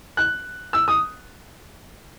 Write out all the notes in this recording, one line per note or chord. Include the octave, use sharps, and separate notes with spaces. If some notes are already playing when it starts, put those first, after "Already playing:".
F#6
E6
D#6